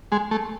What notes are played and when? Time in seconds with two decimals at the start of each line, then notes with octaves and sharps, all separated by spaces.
0.12 G#3
0.31 A3